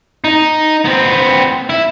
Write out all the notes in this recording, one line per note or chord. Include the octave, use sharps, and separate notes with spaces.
D#4
B3 C4
E4